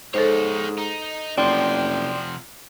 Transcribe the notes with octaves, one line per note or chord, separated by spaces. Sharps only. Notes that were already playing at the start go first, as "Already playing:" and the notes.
G#2 D#4 A4 C5 C#5
D#4
F#1 C3 F3 D5 G5 C6